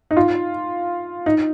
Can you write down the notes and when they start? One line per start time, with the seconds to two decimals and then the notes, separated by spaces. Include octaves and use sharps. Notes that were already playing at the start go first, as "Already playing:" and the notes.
0.11 D#4
0.17 F4
1.26 D#4